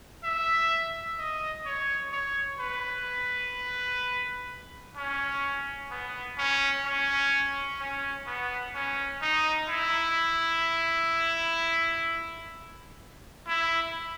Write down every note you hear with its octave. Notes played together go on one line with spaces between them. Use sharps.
E5
D#5
C#5
C#5
B4
C#4
B3
C#4
C#4
C#4
B3
C#4
D#4
E4
E4